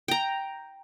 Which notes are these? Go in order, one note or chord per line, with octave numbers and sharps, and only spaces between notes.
G5 A#5